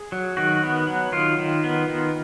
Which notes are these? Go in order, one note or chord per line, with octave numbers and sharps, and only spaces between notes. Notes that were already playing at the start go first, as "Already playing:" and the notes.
Already playing: G#4
F#3
D#3 F#4
B3
F#3
D#3 F4
D#3
B3
D#3